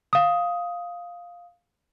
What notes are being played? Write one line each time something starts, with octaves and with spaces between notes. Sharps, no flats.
F5 D#6